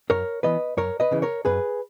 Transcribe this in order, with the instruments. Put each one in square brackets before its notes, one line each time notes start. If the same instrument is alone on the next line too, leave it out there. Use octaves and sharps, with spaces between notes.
[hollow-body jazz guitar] F#2 A#4 C#5
E3 B3 B4 D#5
F#2 A#4 C#5
B4 D#5
C#3 E3
A#4 C#5
F#2 G#4 B4